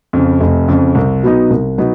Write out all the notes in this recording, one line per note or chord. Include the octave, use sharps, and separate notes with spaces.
F2 C#3
F1
F2 C#3
C2
B2 F#3 B3 D#4
C2
B2 F#3 B3 D#4